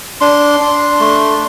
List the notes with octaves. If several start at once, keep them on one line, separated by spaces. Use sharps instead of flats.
D4 C6
D4
A3